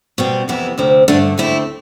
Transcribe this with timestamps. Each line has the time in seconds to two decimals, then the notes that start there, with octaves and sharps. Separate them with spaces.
0.18 B2 G3 C4
0.48 F2 C3 E3 B3 E4
0.78 D2 C3 F3 C4
1.08 G2 D3 A3 D4
1.38 D2 D3 A3 C4 E4